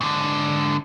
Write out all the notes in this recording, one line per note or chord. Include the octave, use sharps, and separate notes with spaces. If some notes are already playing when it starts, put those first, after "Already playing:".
G#2 D3